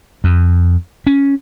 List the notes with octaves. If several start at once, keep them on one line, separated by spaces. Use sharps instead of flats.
F2
C#4